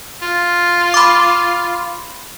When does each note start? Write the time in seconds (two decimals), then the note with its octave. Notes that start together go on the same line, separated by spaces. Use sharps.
0.22 F4
0.94 B5 D6